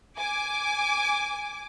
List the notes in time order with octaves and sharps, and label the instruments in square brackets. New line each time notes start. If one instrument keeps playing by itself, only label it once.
[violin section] G#5 D6